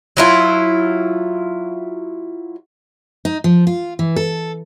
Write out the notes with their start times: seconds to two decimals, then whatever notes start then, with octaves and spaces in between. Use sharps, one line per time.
0.17 F#3 E4 F4
3.25 D#4
3.44 F3
3.67 F4
3.99 E3
4.16 A4